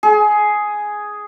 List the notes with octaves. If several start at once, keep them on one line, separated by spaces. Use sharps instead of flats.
G#4